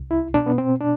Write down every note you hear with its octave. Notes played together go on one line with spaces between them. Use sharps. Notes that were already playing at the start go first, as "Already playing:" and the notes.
Already playing: C2
E4
B2 D4
B3
C4
D4